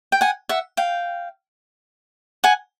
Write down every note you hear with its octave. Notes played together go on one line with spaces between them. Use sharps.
G5
F#5 G#5
E5 F#5
F5 G5
F#5 G#5